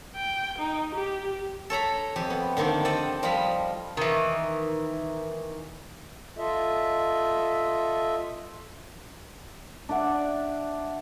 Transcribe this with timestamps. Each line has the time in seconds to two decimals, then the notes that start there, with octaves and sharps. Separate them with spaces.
0.16 G5
0.58 D#4
0.94 G4
1.70 A4 C#5 A#5 B5
2.16 F2 G4 G#5
2.30 B3
2.57 D3 D#3 A#3 C4 D4
2.85 A4 C5 D5 D#5 G5
3.23 F3 G3 F4 D#5 F5 B5
3.97 D#3 E3
6.38 F4 A4 D#5 E5
9.89 D4 D5 E5 F#5